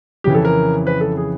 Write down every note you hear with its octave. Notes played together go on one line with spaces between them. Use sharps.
F2 C#3 E3 G4
A4
A#4
B4
A4
G#4